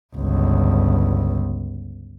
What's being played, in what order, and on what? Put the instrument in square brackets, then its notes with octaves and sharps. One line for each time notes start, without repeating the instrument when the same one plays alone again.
[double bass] G1 C#2